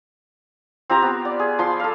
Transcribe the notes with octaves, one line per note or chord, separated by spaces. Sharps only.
C4 F4 G4 A#5
B3
D5
G#4
F3 C6
A4 F5